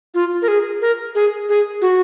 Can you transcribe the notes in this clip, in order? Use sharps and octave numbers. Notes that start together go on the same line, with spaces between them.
F4
A#4
G#4
A#4
G#4
G#4
F#4